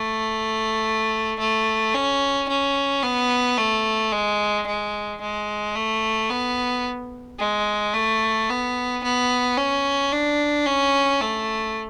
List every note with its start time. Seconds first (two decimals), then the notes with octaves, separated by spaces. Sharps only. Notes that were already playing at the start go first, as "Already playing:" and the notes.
Already playing: A3
1.39 A3
1.94 C#4
2.49 C#4
3.03 B3
3.57 A3
4.12 G#3
4.67 G#3
5.21 G#3
5.75 A3
6.30 B3
7.39 G#3
7.94 A3
8.49 B3
9.04 B3
9.57 C#4
10.12 D4
10.66 C#4
11.21 A3